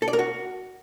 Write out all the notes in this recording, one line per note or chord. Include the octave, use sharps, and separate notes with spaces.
A4
D5
A#4
F#4